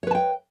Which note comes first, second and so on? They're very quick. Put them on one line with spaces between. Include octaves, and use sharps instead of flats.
C#5 B4 A5 G5